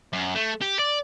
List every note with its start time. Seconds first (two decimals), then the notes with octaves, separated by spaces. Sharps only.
0.13 F#2
0.35 A3
0.62 G4
0.79 D5